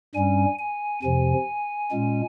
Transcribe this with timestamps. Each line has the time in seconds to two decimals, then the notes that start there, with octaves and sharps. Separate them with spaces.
0.15 G2 G3 C#4 G#5
0.59 G#5
1.03 F2 C3 F3 G#5
1.91 A#2 G#3 C#4